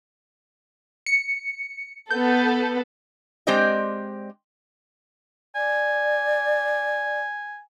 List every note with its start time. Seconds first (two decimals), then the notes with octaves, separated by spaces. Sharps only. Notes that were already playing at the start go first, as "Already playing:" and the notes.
1.06 C#7
2.11 B3 A4 G6
3.47 G#3 C4 G4 C5 D5 D#5
5.56 D5 G#5